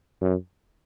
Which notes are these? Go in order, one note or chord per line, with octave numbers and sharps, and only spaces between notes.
F#2